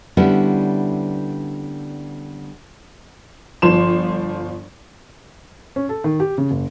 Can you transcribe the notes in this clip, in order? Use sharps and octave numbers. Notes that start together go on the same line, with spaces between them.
D3 G3 B3 C#4 E4
G1 F3 C6 E7
C#4
A4
D#3
G4
C#3
F#1